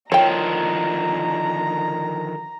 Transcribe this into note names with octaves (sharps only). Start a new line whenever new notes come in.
D3 D#3 F3 C#5 G5 A#5